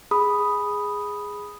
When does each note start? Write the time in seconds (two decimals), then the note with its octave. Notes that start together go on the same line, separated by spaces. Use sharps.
0.11 G#4 B5 D#6